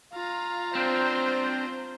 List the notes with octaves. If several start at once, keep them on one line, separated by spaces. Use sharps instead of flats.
F4 F5 A#5
C4 D4 C5